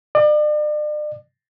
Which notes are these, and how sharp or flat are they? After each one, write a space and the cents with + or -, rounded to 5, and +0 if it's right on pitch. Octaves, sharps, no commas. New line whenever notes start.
D5 +40